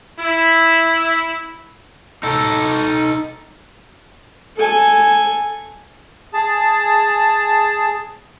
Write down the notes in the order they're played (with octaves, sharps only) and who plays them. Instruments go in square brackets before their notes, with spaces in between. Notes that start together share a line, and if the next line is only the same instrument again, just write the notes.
[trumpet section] E4
[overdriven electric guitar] D#4 A4
[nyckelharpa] A4 G#5
[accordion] G#4 A5